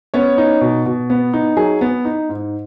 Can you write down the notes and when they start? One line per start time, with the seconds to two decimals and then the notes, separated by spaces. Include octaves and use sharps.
0.14 B3 C#4 C#5
0.38 D#4
0.61 B2
0.86 B2
1.10 B3
1.34 D#4
1.57 F#3 G#4
1.81 B3
2.05 D#4
2.29 G#2